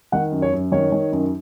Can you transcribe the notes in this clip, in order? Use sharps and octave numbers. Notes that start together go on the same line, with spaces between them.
D#3 F#5
F#2
C#5
F#2
D#3 C#5
D#3
F#2